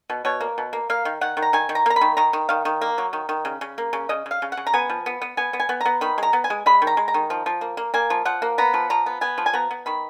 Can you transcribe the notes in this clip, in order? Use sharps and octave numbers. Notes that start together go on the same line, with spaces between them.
B2
B2 C#5
A#3
B2
A#3
A#3 F5
D#3
D#3 F#5
D#3
A#5
D#3 G#5
D#3
A#5
A#3 A#5
B5
D#3
D#3 A#5
D#3
D#3 F5
D#3
A#3
F#3
D#3
D#3
C#3
C#3
A#3
C#3
C#3 D#5
C#3
F5
C#3
F#5
C#3
A#5
B3 G#5
F3
B3
B3
B3 G#5
B3
G#5
B3
B3 A#5
D#3 B5
G#3 A#5
B3
G#5
G#3
G#3 B5
D#3
A#5
G#3
A#5
D#3
F3
F3
A#3
A#3
A#3 G#5
F3
F3 F#5
A#3
B3 A#5
F3
F3 A#5
B3
B3 G#5
F3
G#5
B3 A#5
B3
D#3 B5